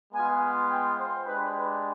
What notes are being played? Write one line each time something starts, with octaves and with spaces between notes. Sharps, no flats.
G#3 B3 F4 G#5
G5
C5
G#3 D4 G4 B4
B4